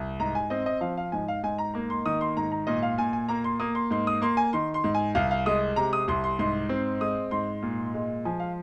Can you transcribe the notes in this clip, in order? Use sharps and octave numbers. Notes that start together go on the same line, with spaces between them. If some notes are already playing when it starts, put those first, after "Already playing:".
Already playing: C2
G#2 A#5
G#5
C4 D#5
D#5
F3 F5
F5
G#2 G#5
F5
G#2 G#5
A#5
A#3 A#5
C6
D#3 D#6
C6
G#2 A#5
A#5
A#2 D#5
F5
A#2 G#5
G#5
A#3 A#5
C6
A#3 D#6
C6
G#2 C6
D#6
A#3 C6
G#5
D#3 C6
C6
G#2
G#5
C2 F5
F5
G#3 D#6
C3 A#5
D#6
C2 C6
C6
G#2 C6
C4
G#3 D#6
G#2 C6
A#2
G#3
F3 G#5
F5